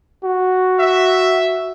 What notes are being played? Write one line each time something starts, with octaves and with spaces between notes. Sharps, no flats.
F#4
E5